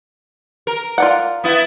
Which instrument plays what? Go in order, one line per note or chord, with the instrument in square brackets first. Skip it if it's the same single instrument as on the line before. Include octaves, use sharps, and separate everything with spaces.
[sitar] A#4
[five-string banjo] F4 D5 F#5
[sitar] B3 E4